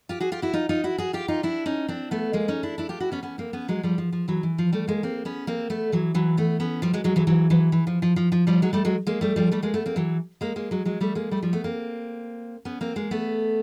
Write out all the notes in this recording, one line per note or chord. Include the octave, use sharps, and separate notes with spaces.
F4 G4
F#4 G#4
F4 G4
E4 F#4
D#4 F4
D#4 F4
E4 F#4
F#4 G#4
F4 G4
D#4 F4
D4 E4
C#4 D#4
C4 D4
A3 B3
G#3 A#3
C#4 D#4
D4 E4
D4 E4
F4 G4
E4 F#4
B3 C#4
B3 C#4
A#3 C4
B3 C#4
F#3 G#3
F3 G3
F3
F3
E3 F#3
E3
F3
G3 A3
G#3 A#3
A#3 C4
B3 C#4
A#3 C4
A3 B3
E3 F#3
E3 F#3
A3 B3
B3 C#4
F3 G3
F#3 G#3
F#3 G#3
E3 F#3
E3 F#3
E3 F#3
E3
F3
F3
F3
F3
F3 G3
F#3 G#3
G3 A3
F#3 G#3
G#3 A#3
G3 A3
F3 G3
G3 A3
G#3 A#3
A3 B3
A#3 C4
E3 F#3
G#3 A#3
G#3 A#3
F#3 G#3
F#3 G#3
G3 A3
G#3 A#3
G3 A3
F3 G3
A3 B3
A#3 C4
B3 C#4
A#3 C4
G#3 A#3
A3 B3